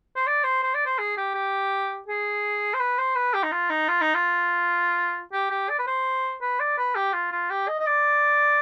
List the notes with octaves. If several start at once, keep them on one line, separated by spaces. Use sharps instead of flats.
C5
D5
C5
C5
D5
C5
G#4
G4
G4
G#4
C5
B4
C5
B4
G4
D#4
F4
D#4
F4
D#4
F4
G4
G4
D5
B4
C5
B4
D5
B4
G4
F4
F4
G4
D#5
D#5
D5